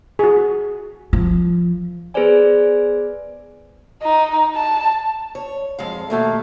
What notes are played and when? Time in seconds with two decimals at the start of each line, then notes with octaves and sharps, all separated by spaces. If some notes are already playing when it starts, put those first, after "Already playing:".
0.19 F#4 G#4
1.13 F3
2.14 B3 G#4 B4 C5 D5 G#5
4.02 D#4
4.55 A5
5.35 C#5
5.79 F2 G#3 F5
6.10 D#2 B2 A3 A#3